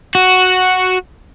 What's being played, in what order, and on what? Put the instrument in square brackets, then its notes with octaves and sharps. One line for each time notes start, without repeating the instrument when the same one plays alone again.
[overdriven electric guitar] F#4